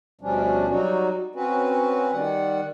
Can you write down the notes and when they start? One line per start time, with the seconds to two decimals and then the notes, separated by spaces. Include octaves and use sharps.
0.21 D2 B2 F3 G3 C#4 D4
0.68 F#3 G3 D#4 F#4
1.35 C4 C#4 F#4 B4
2.12 D#3 G3 F#5